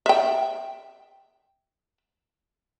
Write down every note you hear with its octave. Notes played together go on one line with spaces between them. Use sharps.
E5 G5